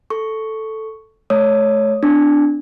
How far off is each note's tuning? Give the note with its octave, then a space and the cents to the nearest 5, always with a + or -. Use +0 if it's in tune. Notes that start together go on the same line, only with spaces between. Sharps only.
A4 +0 C#6 +0
A3 -35 C#5 +0 D#6 +0
B3 +45 D4 +0 D6 +0